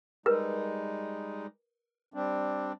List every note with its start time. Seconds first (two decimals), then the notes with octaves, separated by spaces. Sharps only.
0.26 G3 G#3 D#4 A#4 B4
2.14 G3 C4 D4